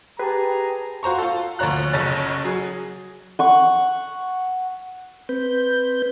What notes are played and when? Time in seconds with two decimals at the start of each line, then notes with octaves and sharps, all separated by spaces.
0.19 G4 G#4 B4 A5 A#5
1.03 F4 F#4 C5 A#5 C#6
1.18 F4 A4
1.59 D2 A#2 F3 C#5 A#5 F#6
1.93 F#1 B1 C#3 C#5 A6
2.44 F#3 G#4
3.39 F#5 C#6
5.29 C4 B4 G6